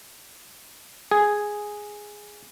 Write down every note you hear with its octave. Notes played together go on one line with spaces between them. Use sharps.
G#4